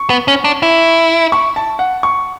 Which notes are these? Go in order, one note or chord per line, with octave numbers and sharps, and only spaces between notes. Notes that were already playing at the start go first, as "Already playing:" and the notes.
Already playing: C#6
B3
C#4
D4
E4
C#6
A5
F#5
C#6